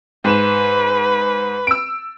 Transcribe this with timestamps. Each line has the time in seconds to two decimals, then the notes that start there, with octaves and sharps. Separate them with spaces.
0.24 G#2 B4 E7
1.67 E6 D7